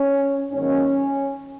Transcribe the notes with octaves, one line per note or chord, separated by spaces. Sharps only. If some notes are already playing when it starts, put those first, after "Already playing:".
Already playing: C#4
G#2 D#3 F#3 A#3 C#4